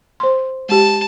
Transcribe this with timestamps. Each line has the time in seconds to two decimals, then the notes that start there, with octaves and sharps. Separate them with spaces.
0.20 C5 C6
0.69 G#3 G4 A5